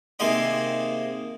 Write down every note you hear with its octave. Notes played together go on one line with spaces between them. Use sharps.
C3 D#3 A#3 G#4 D#5 C6